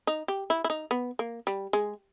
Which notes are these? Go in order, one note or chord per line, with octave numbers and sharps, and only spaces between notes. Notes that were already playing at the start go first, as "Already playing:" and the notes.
D#4
G4
E4
E4
D#4
B3
A#3
G3
G#3